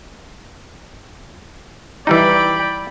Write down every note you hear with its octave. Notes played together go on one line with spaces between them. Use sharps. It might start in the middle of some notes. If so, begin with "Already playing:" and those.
E3 G3 D#4 D5 G5 B5